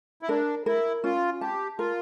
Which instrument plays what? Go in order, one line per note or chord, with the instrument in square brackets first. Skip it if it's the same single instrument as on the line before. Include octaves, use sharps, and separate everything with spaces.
[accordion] E4
[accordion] D4 [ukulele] A#4
[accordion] E4 [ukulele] A#4
[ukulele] C#4 [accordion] F4
[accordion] G4 [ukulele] A5
[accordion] F4 [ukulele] A#4